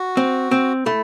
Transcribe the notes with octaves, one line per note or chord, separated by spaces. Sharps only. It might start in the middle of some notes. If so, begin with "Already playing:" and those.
Already playing: F#4
C4
C4
A3 E4